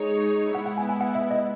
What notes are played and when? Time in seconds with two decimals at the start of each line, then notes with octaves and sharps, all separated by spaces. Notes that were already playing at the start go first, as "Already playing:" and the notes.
Already playing: G#3 D#4 G#4 C#5
0.55 G#3 B3 E4 F#5
0.66 F#5
0.78 G#5
0.89 G#5
1.01 F#5
1.15 E5
1.31 D#5